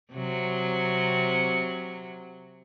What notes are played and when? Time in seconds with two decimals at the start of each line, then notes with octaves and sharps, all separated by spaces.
0.13 C3 F#3